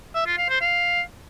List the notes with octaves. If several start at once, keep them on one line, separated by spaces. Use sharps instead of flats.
E5
F4
F5
C5
F5